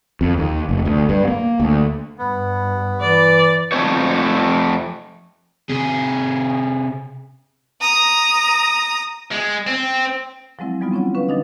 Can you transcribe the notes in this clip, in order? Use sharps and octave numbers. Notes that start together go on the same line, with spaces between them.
F2
D#2
F1
D2
G2
A#3
D2
G2 B3
E3 D5
F2 A3 C4 C5 C#5
C3 G#4
A#5 D#6
G#3
C4
F3 F#3 G#3 C4 E4
E3 F3 G3 B3 D#4 F4
C4 C#4 E4 C#5 F#5
D3 C#4 B4 F5
F3 F#3 D4 D#4 D#5